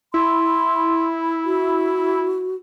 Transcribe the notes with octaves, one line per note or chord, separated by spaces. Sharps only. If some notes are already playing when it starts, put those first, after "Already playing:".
E4 C6
F#4